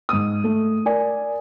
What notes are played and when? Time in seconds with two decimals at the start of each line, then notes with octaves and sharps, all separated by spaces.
0.09 G#2 D#6
0.44 A3
0.85 A#4 D5 G#5